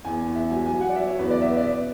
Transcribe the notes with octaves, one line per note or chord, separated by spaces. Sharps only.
E2 G#5
E2
E5
F#3 G#5
G#5
F#3
F#5
D5
F#3 E5
C#5
E2 B4
D5
B3 E5
D5
B2